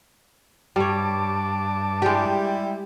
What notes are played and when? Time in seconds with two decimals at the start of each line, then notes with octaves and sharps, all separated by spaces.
0.76 G2 G3 C#5 A5 D6
2.02 G3 G#3 E4 G4